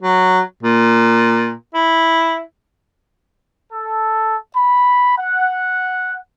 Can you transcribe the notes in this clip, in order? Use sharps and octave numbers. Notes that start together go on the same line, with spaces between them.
F#3
A#2
E4
A4
B5
F#5